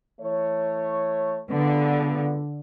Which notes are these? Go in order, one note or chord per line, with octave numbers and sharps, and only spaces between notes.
E3 A3 C#5
C#2 G2 D3 B3